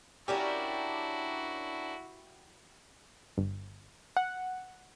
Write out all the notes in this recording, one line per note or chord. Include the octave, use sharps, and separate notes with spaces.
C#4 D4 E4 F#4 G4 A#4
G1
F#5